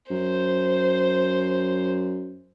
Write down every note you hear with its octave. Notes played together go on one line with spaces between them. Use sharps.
F#2 C5